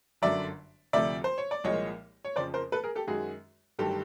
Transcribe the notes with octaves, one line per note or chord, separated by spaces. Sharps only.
G1 F#2 D3 F#3 D5 E5
D2 C3 F3 A3 D5 E5
C5
C#5
D5
C2 A#2 F3 G#3 C#5 D#5
C#5
F2 C#3 F3 C5 D5
A#4 C5
A4 B4
G#4 A#4
G4 A4
F#2 D#3 G#3 F#4 G#4
G1 G2 D#3 F#3 A3 G4 A4